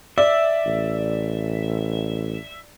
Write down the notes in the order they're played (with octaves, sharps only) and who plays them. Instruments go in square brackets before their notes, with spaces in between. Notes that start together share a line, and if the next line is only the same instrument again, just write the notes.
[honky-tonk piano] D5 [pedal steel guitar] E5
[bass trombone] A1